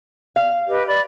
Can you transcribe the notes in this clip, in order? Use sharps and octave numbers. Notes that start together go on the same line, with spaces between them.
F5
G4 B4 D#5
D5 B5